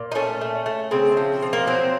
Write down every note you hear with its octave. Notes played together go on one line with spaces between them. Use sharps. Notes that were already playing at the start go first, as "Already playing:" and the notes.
Already playing: A#2
D#4
A3 C#4
A3
A3
C#3 C4
F3
F3
A#3
F#3 C4